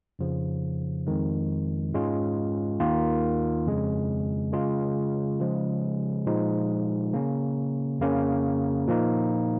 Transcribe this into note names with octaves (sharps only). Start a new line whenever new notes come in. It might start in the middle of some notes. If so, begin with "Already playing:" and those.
F2 C#3 F3
F2 D#3 G#3
G#2 G#3 C#4 F4
D#2 D#3 A#3 F4
F2 C#3 G#3
C#3 G#3 F4
C#3 F3 G#3
A#2 F3 G#3 D#4
C#3 A#3 C#4
F2 C#3 A#3 C#4
A#2 F3 A#3 D#4